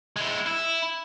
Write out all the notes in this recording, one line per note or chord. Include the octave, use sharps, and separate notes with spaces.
G#3 E4
E4